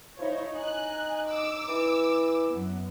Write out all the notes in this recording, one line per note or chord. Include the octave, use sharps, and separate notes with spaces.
F3 D#4 E4 C#5
D#4 G#5 F#6
D6 E6
E3
F#2 B3